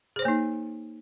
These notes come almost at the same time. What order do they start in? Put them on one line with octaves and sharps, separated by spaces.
G#4 C5 C#5 A#3 D#4